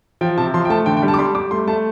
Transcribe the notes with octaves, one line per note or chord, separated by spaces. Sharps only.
F3 G5
C3 A5
F3 C6
G5
A3 A5
D3 G5
G5
G3
A5
D6
G3 C6
G3 D6
A3 C6
A3 A5